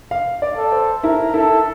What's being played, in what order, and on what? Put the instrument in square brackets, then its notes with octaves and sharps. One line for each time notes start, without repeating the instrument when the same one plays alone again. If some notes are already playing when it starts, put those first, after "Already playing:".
[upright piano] F5
D5
[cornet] A4
[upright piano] C5
[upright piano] E4 [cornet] A#4
[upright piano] E4 [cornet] A4